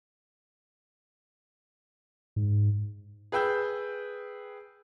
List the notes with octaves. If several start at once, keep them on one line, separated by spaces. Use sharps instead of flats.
G#2
G#4 B4 G5 E6 G6